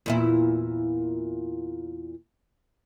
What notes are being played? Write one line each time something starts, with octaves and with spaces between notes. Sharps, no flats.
E2 A#2 E4